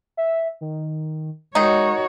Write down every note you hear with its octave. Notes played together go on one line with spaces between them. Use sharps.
E5
D#3
D#3 G#3 D#4 F#4 C#5